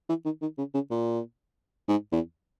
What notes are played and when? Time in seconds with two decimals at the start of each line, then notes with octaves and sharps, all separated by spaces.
0.09 E3
0.25 D#3
0.42 D#3
0.58 C#3
0.74 C#3
0.90 A#2
1.88 G#2
2.12 E2